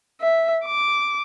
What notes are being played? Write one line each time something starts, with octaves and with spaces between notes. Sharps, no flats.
E5
D6